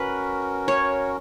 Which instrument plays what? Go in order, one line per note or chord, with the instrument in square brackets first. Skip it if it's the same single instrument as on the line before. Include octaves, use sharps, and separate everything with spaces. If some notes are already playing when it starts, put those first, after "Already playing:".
Already playing: [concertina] C#4 F#4 A#4 [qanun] B4
[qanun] C#5